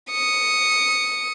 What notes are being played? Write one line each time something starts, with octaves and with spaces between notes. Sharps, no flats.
D#6 C#7